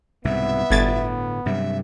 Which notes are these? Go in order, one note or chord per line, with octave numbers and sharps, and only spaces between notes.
C2 G#2 B2 B3 E5
G1 A2 D3 G#6 A6
G2 C3 F#3 E5